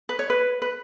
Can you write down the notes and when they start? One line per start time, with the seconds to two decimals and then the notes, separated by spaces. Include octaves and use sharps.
0.09 B4
0.19 C#5
0.30 B4
0.62 B4